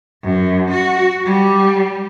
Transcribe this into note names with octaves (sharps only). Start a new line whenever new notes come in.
F#2
F#4
G3